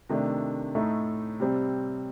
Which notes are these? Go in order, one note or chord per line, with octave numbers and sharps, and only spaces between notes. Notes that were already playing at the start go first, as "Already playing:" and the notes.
C3 D#3 A3 D4
A2 A3 D#4
C3 G3 C4